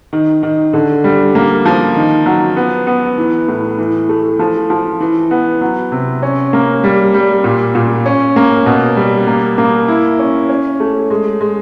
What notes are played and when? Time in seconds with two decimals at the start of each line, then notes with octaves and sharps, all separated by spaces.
0.13 D#3
0.43 D#3
0.73 D3
1.04 G3
1.35 A#3
1.66 F3
1.96 D#3
2.26 F#3
2.56 B3
2.87 B3
3.18 E3
3.48 A2
3.78 E3
4.09 A3
4.39 F3
4.70 F3
5.00 E3
5.31 B3
5.61 F#3
5.92 C3
6.22 C#4
6.53 A#3
6.84 G3
7.14 G3
7.44 A#2
7.75 A#2
8.06 C#4
8.36 A#3
8.66 B2
8.96 G3
9.27 A#3
9.58 A#3
9.88 E4
10.19 C#4
10.49 C#4
10.80 A3
11.10 G#3
11.41 G#3